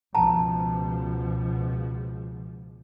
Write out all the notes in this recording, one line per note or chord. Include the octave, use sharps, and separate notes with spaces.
C#2 B2 F3 A5 A#5